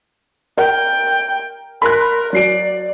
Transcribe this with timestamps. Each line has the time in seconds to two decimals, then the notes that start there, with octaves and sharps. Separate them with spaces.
0.57 A#4 G5
1.82 A#4 B5 C6 F#6
2.33 F#3 D5 C7 D7